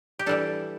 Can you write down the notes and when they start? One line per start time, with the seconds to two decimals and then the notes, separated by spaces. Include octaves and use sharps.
0.19 G4
0.26 E3 G3 D4 A4